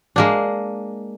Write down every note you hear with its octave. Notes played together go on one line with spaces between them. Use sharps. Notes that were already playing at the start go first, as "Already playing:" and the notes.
G#3 A#3 D4